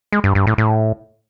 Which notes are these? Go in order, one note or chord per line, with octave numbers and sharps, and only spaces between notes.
G#3
G2
G2
A2
A2